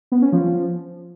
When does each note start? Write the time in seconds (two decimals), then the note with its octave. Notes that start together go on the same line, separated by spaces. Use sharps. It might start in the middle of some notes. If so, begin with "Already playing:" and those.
0.12 B3
0.22 C#4
0.33 F3